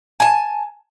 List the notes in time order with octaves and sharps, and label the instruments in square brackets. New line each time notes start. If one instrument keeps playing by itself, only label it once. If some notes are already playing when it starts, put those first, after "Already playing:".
[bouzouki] G#5 A5